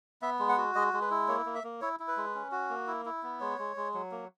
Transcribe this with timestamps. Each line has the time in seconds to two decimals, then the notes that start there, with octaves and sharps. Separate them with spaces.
0.22 B3 E5
0.39 G#3
0.49 F#5
0.57 F#4
0.75 G#3 D#5
0.93 G#3
1.01 B4
1.11 E4
1.28 A#3 C#5
1.46 A#3
1.55 E5
1.64 A#3
1.81 E4 C#5
2.00 E4
2.08 B4
2.17 G#3
2.35 C#4
2.52 F#4
2.70 A#3
2.87 E4
3.05 E4
3.23 B3
3.40 G#3 C#5
3.58 G#3
3.76 G#3
3.94 F#3
4.12 A#3